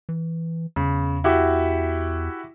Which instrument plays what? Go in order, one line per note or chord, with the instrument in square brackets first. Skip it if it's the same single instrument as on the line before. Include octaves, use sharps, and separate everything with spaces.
[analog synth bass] E3
[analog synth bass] E2 [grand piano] C#3
[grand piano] E4 F#4 G4